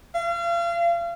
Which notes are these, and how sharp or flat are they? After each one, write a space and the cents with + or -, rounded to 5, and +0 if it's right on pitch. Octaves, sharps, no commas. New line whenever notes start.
F5 -35